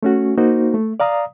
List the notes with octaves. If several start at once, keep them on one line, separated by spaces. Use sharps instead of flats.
A3 C#4 F#4
A#3 D#4 F#4 C5
A3
D5 F5 A#5 D#6